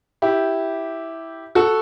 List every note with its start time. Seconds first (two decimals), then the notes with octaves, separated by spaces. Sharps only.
0.22 E4 G4
1.55 F#4 A4